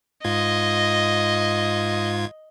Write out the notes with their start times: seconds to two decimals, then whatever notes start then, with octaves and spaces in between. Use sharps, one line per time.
0.24 G#2 F4 D#5 G#6